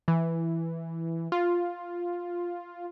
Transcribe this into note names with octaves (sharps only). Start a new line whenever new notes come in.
E3
F4